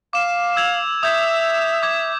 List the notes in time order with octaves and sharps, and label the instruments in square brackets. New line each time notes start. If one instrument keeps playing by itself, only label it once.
[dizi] F5 [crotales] D6 E7
[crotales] E6 G#6 F7
[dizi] E5 [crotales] D#6 G6 G#6
[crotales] D6 G#6